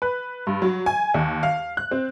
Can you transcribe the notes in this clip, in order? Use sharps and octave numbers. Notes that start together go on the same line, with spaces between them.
B4
G2
F#3
G#5
D#2
F5
F#6
C4